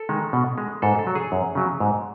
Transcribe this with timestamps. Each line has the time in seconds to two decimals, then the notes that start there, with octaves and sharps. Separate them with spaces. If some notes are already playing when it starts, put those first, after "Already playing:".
Already playing: A4
0.09 D#3 G#3
0.33 B2
0.58 G#3
0.82 G#2 A4
0.99 A4
1.07 F#3
1.15 G#4
1.32 F#2
1.55 C#3 F#3
1.80 G#2